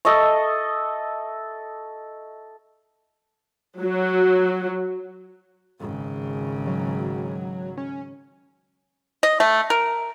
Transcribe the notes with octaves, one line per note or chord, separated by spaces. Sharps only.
A4 D#5 E5 C#6
F#3
G#1 C#3
F#3
C#4
D#5
A3
A#4